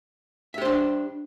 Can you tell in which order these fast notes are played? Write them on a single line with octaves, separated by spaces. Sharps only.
E5 G4 C5 D4